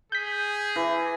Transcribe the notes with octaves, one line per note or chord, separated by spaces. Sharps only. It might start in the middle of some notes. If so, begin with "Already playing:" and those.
G#4 G6 B6
E3